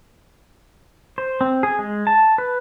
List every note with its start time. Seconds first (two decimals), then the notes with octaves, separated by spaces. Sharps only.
1.18 C5
1.41 C4
1.63 G#4
1.79 G#3
2.07 A5
2.38 B4